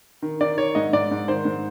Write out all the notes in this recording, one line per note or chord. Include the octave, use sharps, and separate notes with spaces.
D#3
D#3 D5
D#3 C#5
G#2 D#5
G#2 D5
G#2
D#3 C5
G#2